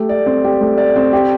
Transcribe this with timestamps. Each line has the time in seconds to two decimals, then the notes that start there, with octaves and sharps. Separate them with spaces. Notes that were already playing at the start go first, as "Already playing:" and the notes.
Already playing: A3 G4
0.09 D5
0.26 C4
0.45 G4
0.61 A3
0.78 D5
0.96 C4
1.13 G4